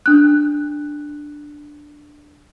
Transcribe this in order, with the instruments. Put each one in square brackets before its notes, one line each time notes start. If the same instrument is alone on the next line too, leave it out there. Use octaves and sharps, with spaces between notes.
[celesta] D4 F#6